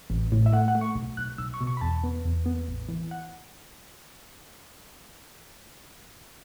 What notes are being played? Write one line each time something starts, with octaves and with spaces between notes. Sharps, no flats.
A1
A2
E5
A3 F#5
F#5
A3
C#6
B1
B1 F#6
B1 E6
C#6
B2
C#6
B5
E2 A5
B3
E2
B3
A1
E3
F#5